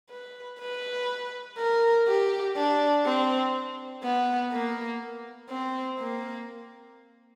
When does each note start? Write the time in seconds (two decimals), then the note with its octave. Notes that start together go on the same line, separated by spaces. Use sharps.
0.10 B4
0.60 B4
1.58 A#4
2.08 G4
2.56 D4
3.05 C4
4.03 B3
4.52 A#3
5.50 C4
5.99 A#3